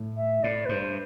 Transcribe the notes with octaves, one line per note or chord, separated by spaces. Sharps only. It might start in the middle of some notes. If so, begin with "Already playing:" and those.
Already playing: A2
E5
A2 D5
B4
G2 C5